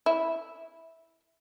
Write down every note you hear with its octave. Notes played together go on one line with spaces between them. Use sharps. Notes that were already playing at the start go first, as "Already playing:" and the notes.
E4